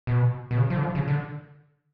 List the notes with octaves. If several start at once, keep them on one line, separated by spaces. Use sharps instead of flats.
B2
B2
C#3
F3
D3
F3
C#3
D3